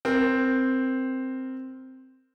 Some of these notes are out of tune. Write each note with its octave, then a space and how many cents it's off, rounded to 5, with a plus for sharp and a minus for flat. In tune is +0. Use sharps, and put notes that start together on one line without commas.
C4 +0 A#4 +0